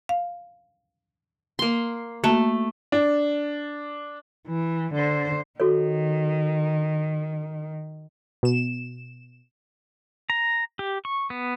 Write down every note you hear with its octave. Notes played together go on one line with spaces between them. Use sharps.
F5
A#3 C6
A3 A#3 F#4 A5
D4
E3
D3 C5
D#3 F#4 A4 C#5
B2 E7
A#5
G4
C#6
B3